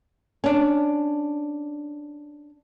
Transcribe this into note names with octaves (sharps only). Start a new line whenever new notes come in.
C#4 D4